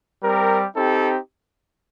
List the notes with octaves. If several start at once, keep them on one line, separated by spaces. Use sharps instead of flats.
G3 C4 G4 A#4
C4 D#4 G4 A4